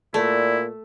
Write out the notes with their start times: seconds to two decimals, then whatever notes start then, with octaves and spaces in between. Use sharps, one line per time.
0.14 A#2 A3 E4 D5